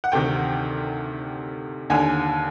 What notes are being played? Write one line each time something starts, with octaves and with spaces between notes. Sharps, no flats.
F#5
D2 C3 D#3 G5
D#2 D3 G#5